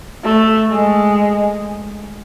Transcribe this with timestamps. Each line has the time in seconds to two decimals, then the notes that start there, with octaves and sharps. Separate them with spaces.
0.24 A3
0.71 G#3